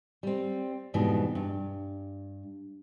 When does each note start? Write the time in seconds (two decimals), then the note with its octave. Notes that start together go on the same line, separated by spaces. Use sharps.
0.23 G3 C4
0.94 F2 G#2 B2 E3 G3
1.35 G2